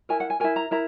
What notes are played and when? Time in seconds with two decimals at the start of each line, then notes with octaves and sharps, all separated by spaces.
0.09 E4 A#4 G#5
0.20 F#5
0.30 G#5
0.40 E4 A#4 G#5
0.56 A#5
0.71 E4 A#4 A#5